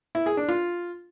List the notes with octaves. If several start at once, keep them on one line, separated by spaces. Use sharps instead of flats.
E4
G#4
D4
F4